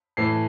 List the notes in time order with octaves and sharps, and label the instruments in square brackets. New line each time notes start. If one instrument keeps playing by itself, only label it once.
[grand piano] A2 E3 A3 C7